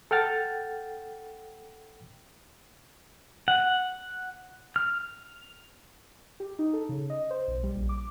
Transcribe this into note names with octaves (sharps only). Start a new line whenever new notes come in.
A4 F#5 G5 F6 A6
F#5
F6
G4
D#4
A4
C#3
D#5
C5
B1
G3
A#1
D6